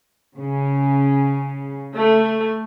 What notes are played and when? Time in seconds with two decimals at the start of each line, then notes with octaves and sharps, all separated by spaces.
0.38 C#3
1.95 A3